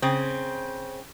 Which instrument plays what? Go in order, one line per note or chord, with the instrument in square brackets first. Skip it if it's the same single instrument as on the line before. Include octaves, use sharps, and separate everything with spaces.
[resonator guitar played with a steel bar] C#3 C4